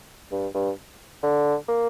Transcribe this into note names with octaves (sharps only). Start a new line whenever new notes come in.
G2
G2
D3
A#3